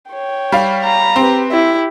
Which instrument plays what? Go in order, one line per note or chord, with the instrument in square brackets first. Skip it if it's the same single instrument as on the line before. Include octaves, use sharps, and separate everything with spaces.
[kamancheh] C#5 G5
[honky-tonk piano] G3 F5
[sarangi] A#5
[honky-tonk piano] C4 [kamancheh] G4 B4
[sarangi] E4 [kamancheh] G4